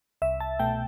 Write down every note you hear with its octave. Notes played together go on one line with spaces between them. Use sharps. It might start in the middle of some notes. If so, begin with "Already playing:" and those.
C2 E5
A5
B2 A3 G5